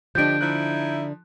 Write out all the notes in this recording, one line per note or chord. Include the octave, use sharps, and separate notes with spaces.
D3 F3 D4 G4 D#5 G6 D7
F3 D#4 E4 F#6